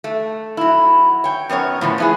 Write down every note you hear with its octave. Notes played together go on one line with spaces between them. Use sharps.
A3
F#3 E4
C#5 G5
F#2 B3 A#4 C#5
A2 C#3 F3 B3
B3 E4 G#4